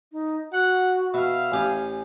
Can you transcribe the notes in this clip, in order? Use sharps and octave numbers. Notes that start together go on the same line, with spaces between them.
D#4
F#4 F#5
B2 E5 F5
A1 G4 G#5